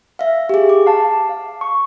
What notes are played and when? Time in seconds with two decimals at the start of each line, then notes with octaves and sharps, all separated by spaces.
0.19 E5 F5
0.49 G4 G#4
0.69 D6
0.86 F5 A5
1.29 F5
1.61 C#6